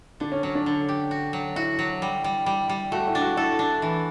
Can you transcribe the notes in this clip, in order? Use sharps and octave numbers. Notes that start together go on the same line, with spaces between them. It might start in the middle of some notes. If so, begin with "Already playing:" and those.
D3 D4
C#4
F#3 C#4
D4
D3
G4
F#4
F#3
E4 F#4
F#3
G3
G3
G3
G3
A3 F#4
E4
D4
F#4
E4 A4
D4
E3